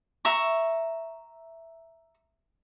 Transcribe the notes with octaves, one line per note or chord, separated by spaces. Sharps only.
E5 A#5 C#6